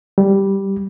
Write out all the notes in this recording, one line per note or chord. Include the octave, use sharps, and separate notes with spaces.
G3